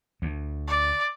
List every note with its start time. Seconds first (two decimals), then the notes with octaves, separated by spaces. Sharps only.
0.22 D2
0.68 D5